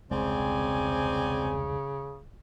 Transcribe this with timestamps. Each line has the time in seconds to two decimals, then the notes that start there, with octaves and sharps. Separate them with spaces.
0.11 E1 C2 C#3 G#3 C4 D5 G#5